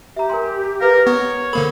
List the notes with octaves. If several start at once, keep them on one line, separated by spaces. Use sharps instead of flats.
G4 E5 A#5
A#4 G#5 C6
A#4 B4 F5
B3 C#5
D3 A#3 A#4 C5 B5